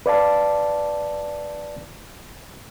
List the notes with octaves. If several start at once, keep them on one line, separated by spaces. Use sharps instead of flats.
B4 D5 F5 A5